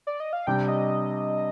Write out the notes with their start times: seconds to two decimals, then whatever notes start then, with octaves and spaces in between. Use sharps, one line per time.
0.07 D5
0.20 D#5
0.33 F5
0.47 C3 G3 D4 G5
0.68 D#5